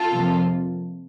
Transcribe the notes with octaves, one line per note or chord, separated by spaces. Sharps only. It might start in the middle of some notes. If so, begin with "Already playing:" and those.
Already playing: F4 A4
F2 C3 F3 A#3